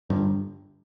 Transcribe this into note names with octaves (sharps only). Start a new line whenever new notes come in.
G1 G2